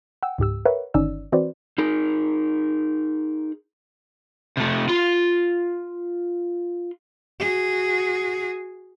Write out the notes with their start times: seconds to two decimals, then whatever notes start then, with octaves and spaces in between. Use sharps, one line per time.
0.23 F#5 G5 E6
0.38 C#2 G#2 G4 E6
0.66 A#4 B4 C#5 E5 F#5
0.94 G1 D#3 C#4 D#4 D5 E6
1.32 E3 C4 F#4 B4 C5 D5
1.78 D#4 G#4 A#4
4.57 C3 A3
4.89 F4 C6
7.40 F#4 G#4